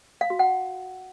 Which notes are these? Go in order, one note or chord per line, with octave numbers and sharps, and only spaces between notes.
F5
F#4
F#5